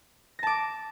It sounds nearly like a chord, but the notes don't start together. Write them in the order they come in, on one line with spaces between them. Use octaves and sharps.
A#6 A5 D6